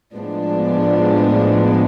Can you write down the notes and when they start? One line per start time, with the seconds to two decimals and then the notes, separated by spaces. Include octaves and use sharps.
0.14 A2 F3 G#3 B3 D4